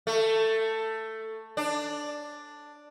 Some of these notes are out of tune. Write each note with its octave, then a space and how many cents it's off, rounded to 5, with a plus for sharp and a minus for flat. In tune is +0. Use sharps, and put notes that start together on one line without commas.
A3 +10
D4 +5